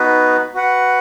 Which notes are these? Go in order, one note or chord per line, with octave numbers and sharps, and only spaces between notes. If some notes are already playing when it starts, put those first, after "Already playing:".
Already playing: B3 D#4 F#4 B4
F#4 B4 F#5